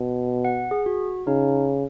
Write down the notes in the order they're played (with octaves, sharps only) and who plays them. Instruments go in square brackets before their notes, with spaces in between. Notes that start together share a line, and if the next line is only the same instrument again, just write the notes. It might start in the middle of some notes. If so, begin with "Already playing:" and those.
Already playing: [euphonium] B2
[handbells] F#5
G#4
F#4
[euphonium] C#3 [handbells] D#4